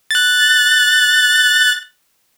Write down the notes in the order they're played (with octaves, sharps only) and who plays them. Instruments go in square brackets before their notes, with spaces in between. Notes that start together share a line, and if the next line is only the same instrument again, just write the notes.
[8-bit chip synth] F#6 A6